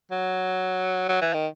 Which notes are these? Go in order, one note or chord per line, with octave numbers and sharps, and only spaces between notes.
F#3
F#3
E3
D#3